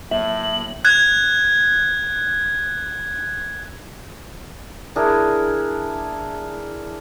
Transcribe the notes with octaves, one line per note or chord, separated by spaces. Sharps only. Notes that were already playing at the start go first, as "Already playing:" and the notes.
A2 F#3 A#3 E5 F#7
F#6 G#6
D4 E4 G#4 A#4